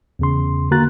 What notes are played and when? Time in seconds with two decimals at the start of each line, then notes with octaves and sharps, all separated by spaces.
0.19 E2 C#3 C6
0.71 D3 A#3 F#4 A#5 F#6 A6